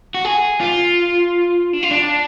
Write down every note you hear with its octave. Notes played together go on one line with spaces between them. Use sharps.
F#4
G#4
F4
D4
F4
D4